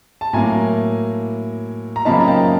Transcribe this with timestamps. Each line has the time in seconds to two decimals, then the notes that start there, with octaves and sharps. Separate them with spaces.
0.21 A5
0.33 A2 F#3 A#3 G#5 A#5
1.96 A#5
2.05 F#2 C#3 F3 A#3 D#4 A5 B5
2.20 A#5
2.27 G5 A5